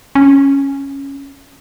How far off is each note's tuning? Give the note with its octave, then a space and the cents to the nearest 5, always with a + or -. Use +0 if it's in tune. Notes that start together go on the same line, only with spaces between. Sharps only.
C#4 -5